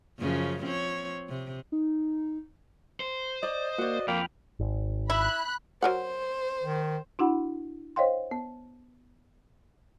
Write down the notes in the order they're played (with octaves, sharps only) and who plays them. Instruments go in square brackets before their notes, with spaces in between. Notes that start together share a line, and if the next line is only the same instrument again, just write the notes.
[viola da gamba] F#2 C#3 F3
F3 C4 C#5
C3
[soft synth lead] D#4
[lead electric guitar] C5
[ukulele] D5 [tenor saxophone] D#5
[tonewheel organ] A#3 [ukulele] F#4 D5
[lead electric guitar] F2 [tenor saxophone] A#3 [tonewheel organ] G5 B5 F6
[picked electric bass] G#1
[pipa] E4 [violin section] B5 F#6
[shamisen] F#3 A#4 F#5 [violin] C5
[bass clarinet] D#3
[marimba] D4 E4 F#4 F#5 B5
C5 C#5 D#5 F5 G5 C6
B3